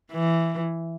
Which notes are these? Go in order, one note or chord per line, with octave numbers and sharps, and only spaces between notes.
E3